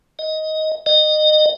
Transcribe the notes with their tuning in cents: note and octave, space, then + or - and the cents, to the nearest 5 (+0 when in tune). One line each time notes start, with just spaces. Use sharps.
D#5 +10
D#5 -25